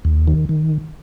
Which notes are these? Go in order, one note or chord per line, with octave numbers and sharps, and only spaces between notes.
D#2
D#3
D#3